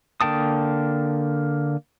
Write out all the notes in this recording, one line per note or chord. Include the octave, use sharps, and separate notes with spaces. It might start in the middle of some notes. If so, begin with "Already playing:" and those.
D3 A#3 G5 A5 D#6